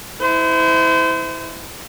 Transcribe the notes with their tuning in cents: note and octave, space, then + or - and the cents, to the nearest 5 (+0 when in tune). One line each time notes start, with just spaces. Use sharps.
E4 -20 C5 -35